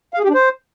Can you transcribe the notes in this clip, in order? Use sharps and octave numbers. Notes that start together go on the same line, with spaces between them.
F5
G#4
G4
D4
C5